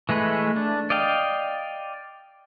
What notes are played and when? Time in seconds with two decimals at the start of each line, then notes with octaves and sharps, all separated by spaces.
0.09 E3 G#3 A3 B4
0.56 D4
0.90 D5 D#5 F5 G5